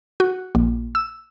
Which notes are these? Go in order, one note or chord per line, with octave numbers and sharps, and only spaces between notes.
F#4
A#1
E6